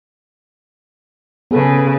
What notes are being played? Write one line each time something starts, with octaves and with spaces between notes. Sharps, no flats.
C#3 B3 G#4 A4 B4